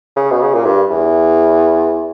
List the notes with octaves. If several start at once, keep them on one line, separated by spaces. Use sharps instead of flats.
C#3
B2
C#3
A#2
G2
E2